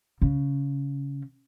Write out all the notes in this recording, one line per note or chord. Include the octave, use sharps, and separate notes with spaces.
C#3